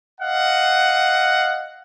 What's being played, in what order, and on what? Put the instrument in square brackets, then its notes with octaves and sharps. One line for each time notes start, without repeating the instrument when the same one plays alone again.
[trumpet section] D#5 F5 F#5